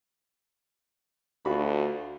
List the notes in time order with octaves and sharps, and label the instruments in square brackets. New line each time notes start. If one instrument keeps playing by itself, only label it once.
[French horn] D2 [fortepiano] F4 F#4 B5